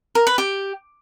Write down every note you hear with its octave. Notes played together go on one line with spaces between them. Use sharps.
A#4
B4
G4